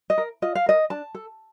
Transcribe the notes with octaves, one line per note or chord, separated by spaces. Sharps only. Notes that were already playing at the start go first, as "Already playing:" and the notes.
D#5
A#4
F4 D#5
F5
A#4 D#5
D4 A5
A4